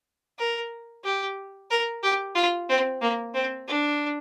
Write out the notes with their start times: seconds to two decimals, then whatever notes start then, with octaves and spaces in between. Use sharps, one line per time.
0.38 A#4
1.04 G4
1.70 A#4
2.03 G4
2.35 F4
2.69 C4
3.01 A#3
3.34 C4
3.67 D4